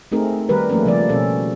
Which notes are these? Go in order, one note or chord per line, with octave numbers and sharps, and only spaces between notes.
A3 C4 D#4 G#4 A#4
D#3 G3 G4 A#4 B4
F3 A3 A#3 C#4 A#4
C#3 F3 G3 C4 D5
B2 C#4 A4